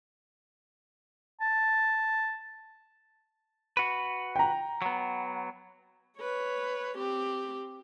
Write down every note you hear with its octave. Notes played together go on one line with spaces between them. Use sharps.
A5
F#4 B4
G5 A#5
F#3 B3
B4 C#5
C4 G4